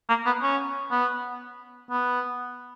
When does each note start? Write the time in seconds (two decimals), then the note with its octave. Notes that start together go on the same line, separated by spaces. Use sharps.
0.09 A#3
0.26 B3
0.42 C#4
0.92 B3
1.91 B3